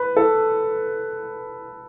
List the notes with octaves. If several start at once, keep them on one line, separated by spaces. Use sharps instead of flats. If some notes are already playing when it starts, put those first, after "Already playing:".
Already playing: B4
A4